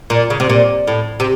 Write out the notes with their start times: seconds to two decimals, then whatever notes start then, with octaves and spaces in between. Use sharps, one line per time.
0.10 A#2
0.30 C#3
0.40 C3
0.50 A#2
0.87 A2
1.20 C3